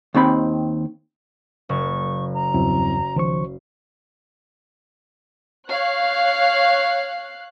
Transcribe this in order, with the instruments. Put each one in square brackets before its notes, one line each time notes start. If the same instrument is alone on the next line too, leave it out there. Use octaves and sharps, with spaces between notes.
[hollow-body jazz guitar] D#2 D#3 C4 B5
[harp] F#1 [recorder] C#6
[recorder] A#5
[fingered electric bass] E2 G2 C#3 [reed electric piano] F#3 C4 E4
[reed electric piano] C#2 C5 C#6 [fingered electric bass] D#3 F3
[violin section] C#5 F5 F#6